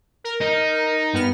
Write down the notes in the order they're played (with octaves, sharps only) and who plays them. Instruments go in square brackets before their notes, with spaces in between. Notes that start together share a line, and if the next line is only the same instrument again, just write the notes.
[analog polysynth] A#4
[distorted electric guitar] D#4
[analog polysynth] G2 B3 F6